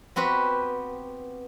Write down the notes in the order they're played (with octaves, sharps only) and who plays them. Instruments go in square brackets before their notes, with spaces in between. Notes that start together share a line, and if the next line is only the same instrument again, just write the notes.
[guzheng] B3 C4 F#4 G4 B4